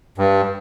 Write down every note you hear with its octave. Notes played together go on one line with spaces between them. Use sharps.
G2